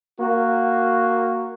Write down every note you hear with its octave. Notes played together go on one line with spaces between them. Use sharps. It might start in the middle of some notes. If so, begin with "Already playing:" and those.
A#3 F#4